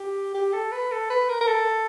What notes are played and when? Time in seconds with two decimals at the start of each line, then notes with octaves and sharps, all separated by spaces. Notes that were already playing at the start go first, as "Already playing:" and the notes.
Already playing: G4
0.35 G4
0.53 A4
0.72 B4
0.91 A4
1.10 B4
1.29 A#4
1.41 A#4
1.48 A4